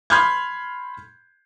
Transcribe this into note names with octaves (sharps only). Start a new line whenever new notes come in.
B5 C6 F6 G6 G#6